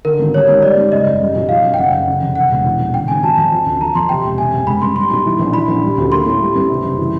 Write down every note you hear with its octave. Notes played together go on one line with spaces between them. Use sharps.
D3 A#4
G#1
G3 C#5
G#2
G3 D5
G#2
C#3 D#5
F#1
G3
B1
F3 F5
F#2
G5
C#3 F#5
F#1
C#3
F1
C#3 F#5
E1
E3
A#1
C#3 G5
G#1 G#5
F#3 A5
F2
F3
D2
F3 A#5
F2 C6
C3 G5
E1
C3 G#5
F#1
G#3 B5
G2 C6
G3 C6
B1
E3
A#1
E3 B5
A#1
G3
D2
A#3 C6
A2
G3
G2
C3
F#1
E3